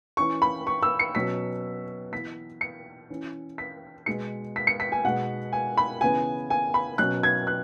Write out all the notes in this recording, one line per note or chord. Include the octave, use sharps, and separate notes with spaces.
E3 C#4 C#6
B5
C#6
E6
C#7
B2 F#3 C#4 B6
E3 B3 B6
C#7
E3 C#4
B6
B2 G#3 B3 C#7
B6
C#7
B6
G#5
B2 G#3 B3 F#5
G#5
B5
C#3 E3 B3 G#5
G#5
B5
B2 F#3 C#4 F#6
G#6
F#6